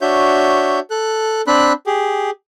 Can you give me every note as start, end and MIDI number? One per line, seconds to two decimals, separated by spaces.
0.01 0.80 62
0.01 0.80 66
0.01 0.80 73
0.01 0.80 76
0.01 0.80 91
0.90 1.42 69
0.90 1.42 90
1.47 1.73 60
1.47 1.73 62
1.47 1.73 83
1.47 1.73 90
1.86 2.30 67
1.86 2.30 68